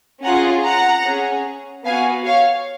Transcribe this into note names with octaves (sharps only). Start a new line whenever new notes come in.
C#4 F4 G#4 F#5 A#5
F#5 A#5
C#4 G#4
B3 F#4 F5 G#5
C#5 F5